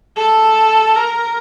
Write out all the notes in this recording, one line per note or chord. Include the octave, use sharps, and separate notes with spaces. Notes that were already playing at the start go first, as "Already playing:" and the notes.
A4
A#4